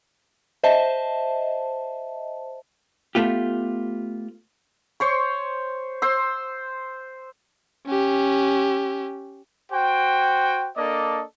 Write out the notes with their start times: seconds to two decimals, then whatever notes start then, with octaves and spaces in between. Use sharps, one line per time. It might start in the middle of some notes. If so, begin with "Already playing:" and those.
0.64 C5 D#5 E5 A5
3.15 A3 B3 F4 G4
5.00 C5 C#5 C#6
6.02 C5 E6
7.87 C#4 G4
9.72 F#4 C5 G5
10.77 A#3 D4 A4 D5 D#5